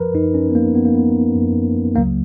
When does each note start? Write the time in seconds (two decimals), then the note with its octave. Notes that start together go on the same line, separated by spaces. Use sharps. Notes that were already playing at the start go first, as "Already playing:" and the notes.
Already playing: F#2 F3 A#4 B4
0.14 F#2 F3 D#4
0.34 C#4
0.50 B3
0.55 A#3
0.74 F#2 F3 B3
0.85 A#3
0.95 B3
1.35 F#2 F3
1.95 C#2 C#3 F#3 A#3